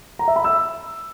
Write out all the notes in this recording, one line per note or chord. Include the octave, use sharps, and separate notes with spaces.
A#5
E5
B5
E6